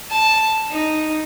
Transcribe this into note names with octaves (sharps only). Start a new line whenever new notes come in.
A5
D#4